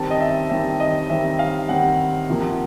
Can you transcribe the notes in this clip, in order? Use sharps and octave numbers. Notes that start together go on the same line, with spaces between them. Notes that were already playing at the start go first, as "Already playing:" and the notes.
Already playing: D#3 G3 C4 A5
D#5
E5
D#3 G3 C4 E5
D#5
D#3 G3 C4 E5
F5
D#3 G3 C4 F#5
C3 F3 A#3